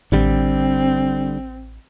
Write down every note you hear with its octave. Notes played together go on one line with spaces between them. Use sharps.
A1 D3 G3 C4